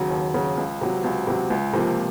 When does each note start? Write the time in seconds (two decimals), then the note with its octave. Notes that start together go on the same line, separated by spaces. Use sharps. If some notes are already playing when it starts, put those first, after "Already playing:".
Already playing: D#2 C#3 F#3
0.10 D#2
0.34 C#3 F#3
0.57 C#2
0.81 C3 F#3
1.04 C#2
1.27 C3 F#3
1.50 C#2
1.73 C3 F3 A#3